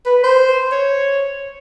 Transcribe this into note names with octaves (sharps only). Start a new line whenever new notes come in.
B4
C5
C#5